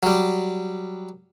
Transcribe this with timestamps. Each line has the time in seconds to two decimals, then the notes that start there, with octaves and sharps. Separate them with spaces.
0.03 F#3 G3